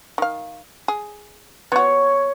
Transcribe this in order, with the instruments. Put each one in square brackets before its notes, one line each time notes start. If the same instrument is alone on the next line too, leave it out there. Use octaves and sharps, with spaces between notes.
[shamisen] D#3 F5
G#4
[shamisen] B3 F#4 [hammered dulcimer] C#5